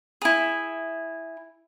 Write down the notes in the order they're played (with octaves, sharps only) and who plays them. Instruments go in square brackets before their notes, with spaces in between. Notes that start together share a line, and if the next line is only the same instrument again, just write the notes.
[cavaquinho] E4 G#4